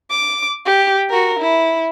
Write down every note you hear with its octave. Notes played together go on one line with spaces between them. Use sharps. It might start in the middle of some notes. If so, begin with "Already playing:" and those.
D6
G4
F#4 A#4
E4